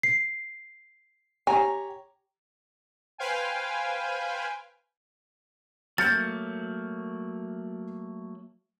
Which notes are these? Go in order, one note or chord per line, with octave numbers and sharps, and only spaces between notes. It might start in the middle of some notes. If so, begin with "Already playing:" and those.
C7
G4 C#5 G#5 A#5
B4 C5 F5 G5 G#5
F#3 A3 A#3 F6 G6 A6 C#7